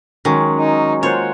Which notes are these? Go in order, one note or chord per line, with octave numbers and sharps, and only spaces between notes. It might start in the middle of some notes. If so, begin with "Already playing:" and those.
D#3 F#3 G#3 C#4
D#4
A#3 F4 C5 C#5 F#5